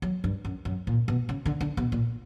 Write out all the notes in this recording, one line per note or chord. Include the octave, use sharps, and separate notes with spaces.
F#3
G2
F#2
F#2
A#2
B2
C#3
D3
D3
B2
A#2